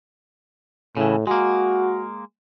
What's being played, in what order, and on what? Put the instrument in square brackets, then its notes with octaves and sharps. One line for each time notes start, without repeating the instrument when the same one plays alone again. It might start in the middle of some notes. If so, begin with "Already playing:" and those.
[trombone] A2 [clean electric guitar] C#3 E3
[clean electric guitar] G#3 A#3 [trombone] F#4